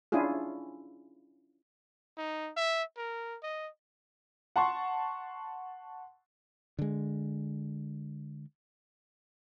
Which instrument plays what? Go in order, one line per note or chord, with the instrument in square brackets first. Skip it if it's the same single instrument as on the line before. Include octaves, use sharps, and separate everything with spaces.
[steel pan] C#4 D4 E4 F4 G#4
[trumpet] D#4
E5
A#4
D#5
[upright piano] F#5 A5 C6 C#6
[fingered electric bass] D3 G#3